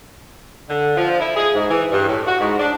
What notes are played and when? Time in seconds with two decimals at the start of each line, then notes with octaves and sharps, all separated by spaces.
0.70 D3
0.97 F3
1.20 E4
1.36 G#4
1.55 G#2
1.69 E3
1.92 G2
2.08 A2
2.27 F#4
2.40 G#2
2.59 D4